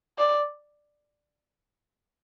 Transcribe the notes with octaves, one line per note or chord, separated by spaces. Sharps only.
D5